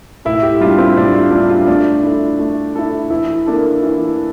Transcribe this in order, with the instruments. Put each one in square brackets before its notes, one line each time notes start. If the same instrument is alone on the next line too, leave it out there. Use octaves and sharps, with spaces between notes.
[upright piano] A2 [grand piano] E4
[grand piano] G4
[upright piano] G3 D4 [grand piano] F4
[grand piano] C4
[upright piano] A2 [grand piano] D4
[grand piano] F4
[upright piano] G3 D4 [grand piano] F4
[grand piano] F4
[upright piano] A3 [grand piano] D4
[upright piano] E4 A4
A3
E4 A4
[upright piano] E3 [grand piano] E4
[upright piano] A#3 D4 A4
E3